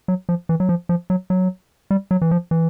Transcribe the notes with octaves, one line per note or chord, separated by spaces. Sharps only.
F#3
F3
E3
F#3
F3
F3
F#3
F#3
G3
F#3
E3
F3
E3